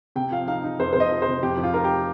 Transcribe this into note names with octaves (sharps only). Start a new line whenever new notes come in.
C3 G5
F3 F5
D#4 F5
D#4
F2 C5
C5
C3 D#5
F3
C5
C3
F2 G4
F2
F4
D#4 A#4
G4